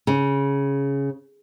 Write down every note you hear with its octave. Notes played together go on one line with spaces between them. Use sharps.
C#3